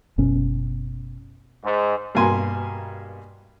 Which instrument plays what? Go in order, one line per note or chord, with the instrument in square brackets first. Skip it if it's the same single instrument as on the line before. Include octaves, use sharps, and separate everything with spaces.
[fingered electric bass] F#1 B2 C#4
[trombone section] G#2
[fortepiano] G2 B2 A#3 G#5 A#5 C6